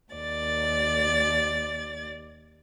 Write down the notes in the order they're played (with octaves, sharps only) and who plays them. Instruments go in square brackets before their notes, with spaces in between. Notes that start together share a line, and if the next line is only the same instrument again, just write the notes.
[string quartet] D#2 D5 A6